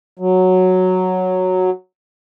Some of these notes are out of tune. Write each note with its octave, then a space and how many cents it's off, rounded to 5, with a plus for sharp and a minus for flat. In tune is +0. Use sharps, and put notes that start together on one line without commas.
F#3 -5